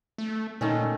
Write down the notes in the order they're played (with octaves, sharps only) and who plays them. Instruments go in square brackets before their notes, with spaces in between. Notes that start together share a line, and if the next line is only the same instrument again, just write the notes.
[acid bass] A3
[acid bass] A#2 [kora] D#3 A3 C#4